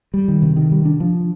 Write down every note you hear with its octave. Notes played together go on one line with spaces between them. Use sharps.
G3
D#3
C3
D#3
G3
D4
F3